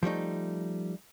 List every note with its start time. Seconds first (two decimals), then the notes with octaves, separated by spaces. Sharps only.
0.03 F3 G3 A3 D#4